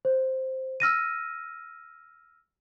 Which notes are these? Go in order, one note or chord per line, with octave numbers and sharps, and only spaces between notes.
C5
E6 F6 A#6 D#7